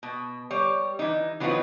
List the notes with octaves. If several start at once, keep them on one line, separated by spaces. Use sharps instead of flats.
B2
G3 C#5
E3 D#4
E3 F#3 B3 C4 D#4 F4